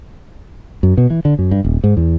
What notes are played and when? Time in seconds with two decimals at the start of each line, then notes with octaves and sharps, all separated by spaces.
0.83 F#2
0.97 B2
1.10 E3
1.25 D3
1.39 F#2
1.51 G2
1.64 D#1
1.84 G#2
1.97 E2